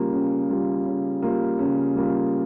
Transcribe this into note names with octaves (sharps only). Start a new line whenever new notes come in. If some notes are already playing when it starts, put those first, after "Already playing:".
Already playing: C#3 G3 A#3 F4
C#3
G3 A#3 F4
C#3
G3 A#3 F4
C#3
G3 A#3 F4